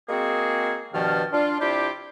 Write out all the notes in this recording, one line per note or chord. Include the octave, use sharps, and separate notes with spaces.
G#3 A#3 C4 F#4 G#4
G2 B2 D#3 F3 A5 F6
D4 F4
C3 D4 E4 F4 G4